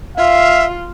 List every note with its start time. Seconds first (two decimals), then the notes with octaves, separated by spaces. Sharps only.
0.17 F4 E5 F5